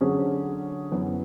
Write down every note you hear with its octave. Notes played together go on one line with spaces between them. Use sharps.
D3 F#3 C#4 G#4 C#5
F#2 E3 B3